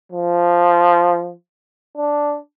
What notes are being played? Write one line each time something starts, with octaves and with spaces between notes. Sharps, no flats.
F3
D4